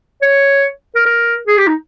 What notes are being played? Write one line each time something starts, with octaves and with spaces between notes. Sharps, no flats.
C#5
A#4
A#4
G#4
G4
D#4